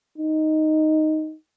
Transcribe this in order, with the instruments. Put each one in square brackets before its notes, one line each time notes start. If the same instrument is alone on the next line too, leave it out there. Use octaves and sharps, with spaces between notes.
[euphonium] D#4